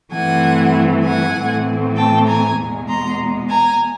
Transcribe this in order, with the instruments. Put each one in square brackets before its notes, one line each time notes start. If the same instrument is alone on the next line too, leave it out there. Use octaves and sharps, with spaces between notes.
[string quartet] G2 E3 A3 C4 F#5 G#5
F#5 G#5
A2 E3 A3 C4
G5 A5
G#5 A#5
E2 B2 G#3 B3
A#5 C6
G#5 A#5